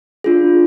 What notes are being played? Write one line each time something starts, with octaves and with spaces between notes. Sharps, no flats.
D4 F4 G#4